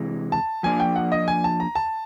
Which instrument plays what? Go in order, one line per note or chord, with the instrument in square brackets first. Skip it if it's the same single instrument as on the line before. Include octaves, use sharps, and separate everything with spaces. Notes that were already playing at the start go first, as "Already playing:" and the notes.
Already playing: [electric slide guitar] C3 E3 G#3
[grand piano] A5
[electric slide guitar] F3 A#3 D4 [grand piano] G#5
[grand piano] G5
F#5
D#5
G#5
A5
A#5
A5